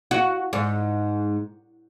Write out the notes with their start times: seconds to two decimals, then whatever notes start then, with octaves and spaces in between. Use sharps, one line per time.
0.11 F#4
0.53 G#2